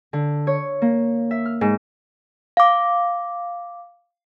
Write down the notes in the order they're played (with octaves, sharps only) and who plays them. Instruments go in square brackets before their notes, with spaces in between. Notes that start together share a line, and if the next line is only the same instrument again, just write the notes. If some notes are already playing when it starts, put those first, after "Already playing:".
[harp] D3
C#5
A#3
E5
F6
G#2
[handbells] F5 D6